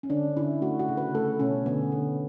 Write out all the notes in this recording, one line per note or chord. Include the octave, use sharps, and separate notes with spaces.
C#4
D3 D4
D3 E4
A3 F#4
F#4
C#3
B4
A3 A4
B2 C#4
D3 B3
D3